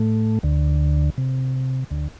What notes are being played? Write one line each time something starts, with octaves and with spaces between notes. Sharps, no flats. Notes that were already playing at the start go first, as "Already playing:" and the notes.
Already playing: A2 A3
D2 D3
C3
D2 D3